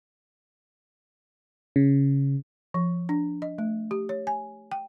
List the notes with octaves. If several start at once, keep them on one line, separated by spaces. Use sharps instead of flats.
C#3
F3
D4
D#5
A3
G4
C#5
G#5
G5